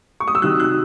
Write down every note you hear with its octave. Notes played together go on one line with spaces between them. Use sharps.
C#6
D#6
E6
C3 D#3 F#3 F#6
F#6